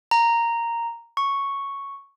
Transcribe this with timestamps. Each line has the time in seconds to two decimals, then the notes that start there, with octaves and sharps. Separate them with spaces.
0.11 A#5
1.17 C#6